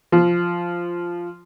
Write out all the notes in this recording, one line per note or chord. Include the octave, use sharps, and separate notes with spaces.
F3